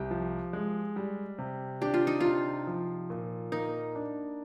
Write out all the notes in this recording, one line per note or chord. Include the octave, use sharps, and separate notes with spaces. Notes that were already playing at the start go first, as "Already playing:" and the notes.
Already playing: C2 G4
F3
G#3
G3
C3
D4 G4
F4
D#4
C3 F4
F3
A#2
A#3 D#4
D4